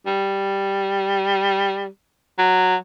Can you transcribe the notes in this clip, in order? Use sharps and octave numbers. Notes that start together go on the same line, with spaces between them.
G3
F#3